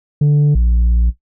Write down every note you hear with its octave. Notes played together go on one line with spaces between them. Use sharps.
D3
A#1